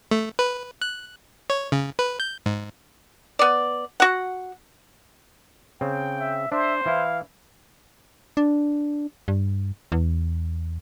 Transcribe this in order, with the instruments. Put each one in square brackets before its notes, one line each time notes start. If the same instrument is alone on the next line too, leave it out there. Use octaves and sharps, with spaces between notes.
[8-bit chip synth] A3
B4
F#6
C#5
C#3
B4
G6
G#2
[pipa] B3 D5
F#4 F#5
[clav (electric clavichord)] C#3 C4 [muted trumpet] G5
[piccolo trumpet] E5
[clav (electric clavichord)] D4 [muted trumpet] C5 [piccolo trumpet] E5
[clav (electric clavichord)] E3 E4 [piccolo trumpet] F5
[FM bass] D4
G2
E2